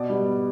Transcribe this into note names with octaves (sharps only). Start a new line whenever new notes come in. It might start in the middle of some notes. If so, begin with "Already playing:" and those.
Already playing: B2 D5
G3 B3